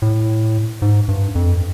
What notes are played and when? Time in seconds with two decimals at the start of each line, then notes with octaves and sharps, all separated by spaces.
0.02 A2
0.82 G#2
1.08 G2
1.35 F2